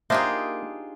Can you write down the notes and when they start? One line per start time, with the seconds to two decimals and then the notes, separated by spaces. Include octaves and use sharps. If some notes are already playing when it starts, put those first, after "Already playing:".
0.10 A#3 D4 D#4 F4 G4 G#4 C5 E5